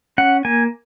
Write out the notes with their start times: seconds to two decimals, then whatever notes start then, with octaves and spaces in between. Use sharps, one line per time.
0.18 C#4 F#5
0.45 A#3 G#5